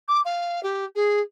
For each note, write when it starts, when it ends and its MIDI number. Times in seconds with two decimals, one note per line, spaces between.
0.08 0.20 86
0.25 0.62 77
0.63 0.85 67
0.95 1.20 68